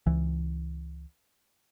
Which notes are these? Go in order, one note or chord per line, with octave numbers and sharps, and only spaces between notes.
C#2 E3